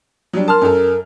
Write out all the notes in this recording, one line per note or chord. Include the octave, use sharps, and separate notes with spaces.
F#3 G3 D4
A#4 A5 C6 F6
F#2 A4